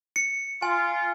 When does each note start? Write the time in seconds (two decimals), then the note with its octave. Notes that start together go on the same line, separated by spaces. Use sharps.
0.16 C#7
0.62 F4 G#5